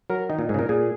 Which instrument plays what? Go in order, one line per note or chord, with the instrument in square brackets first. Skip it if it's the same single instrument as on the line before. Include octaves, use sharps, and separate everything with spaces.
[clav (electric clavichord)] F#3 [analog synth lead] A#4
[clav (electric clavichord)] D#3 [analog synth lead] D#4
[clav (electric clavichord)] A#2
[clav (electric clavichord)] G#2 [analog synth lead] G#4
[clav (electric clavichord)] C#3
[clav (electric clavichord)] A#2 [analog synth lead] A#4
[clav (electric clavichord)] A#2 [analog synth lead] G#4